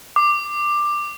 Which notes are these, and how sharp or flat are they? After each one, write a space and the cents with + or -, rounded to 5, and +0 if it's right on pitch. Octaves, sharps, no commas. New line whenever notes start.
D6 +10